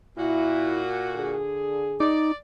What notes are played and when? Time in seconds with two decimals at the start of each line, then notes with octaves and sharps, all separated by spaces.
0.18 A#2 E4 F#4
1.14 D3 G#4
2.00 D#4 D5